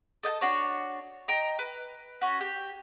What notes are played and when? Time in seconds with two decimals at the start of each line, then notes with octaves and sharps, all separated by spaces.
0.23 A4 D#5 G5 A5
0.41 D4 F#4 C#5
1.28 D#5 G5 A#5
1.59 B4
2.21 C#4 F#4
2.41 G4